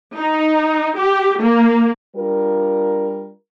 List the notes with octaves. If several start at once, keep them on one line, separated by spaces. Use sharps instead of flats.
D#4
G4
A#3
G3 D4 F4 A#4